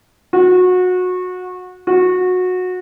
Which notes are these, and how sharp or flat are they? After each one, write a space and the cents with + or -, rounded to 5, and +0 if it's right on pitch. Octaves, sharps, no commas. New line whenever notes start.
F#4 -25
F#4 -20